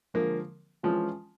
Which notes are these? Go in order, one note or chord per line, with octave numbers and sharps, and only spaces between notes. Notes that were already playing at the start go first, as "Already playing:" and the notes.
D3 F3 G#3 A#3
E3 F3 G#3 C#4 F4